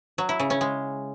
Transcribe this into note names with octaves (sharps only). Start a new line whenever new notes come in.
F#3
E4
C#3
C#4
G#3